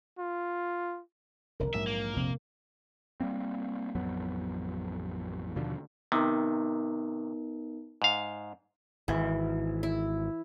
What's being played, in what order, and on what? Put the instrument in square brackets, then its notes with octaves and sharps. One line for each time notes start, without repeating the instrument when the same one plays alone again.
[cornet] F4
[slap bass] F1 C2 D3 [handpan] A#4
[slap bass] A#1 G#2 F#3 [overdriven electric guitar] E5
[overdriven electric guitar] A#3
[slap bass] A#1 F2 C4 [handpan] C3
[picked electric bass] G3 A3 A#3 C4
A1 F2 F#3 B3
D#2 B2 D3 F3
[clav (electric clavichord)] C3 D#3 [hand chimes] B3 D#4 A#4
[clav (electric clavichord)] G#2 F5
[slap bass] G#1 [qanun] E3
[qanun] E4